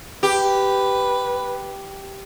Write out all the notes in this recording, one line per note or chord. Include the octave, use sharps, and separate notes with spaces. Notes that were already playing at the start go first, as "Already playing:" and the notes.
G4 B4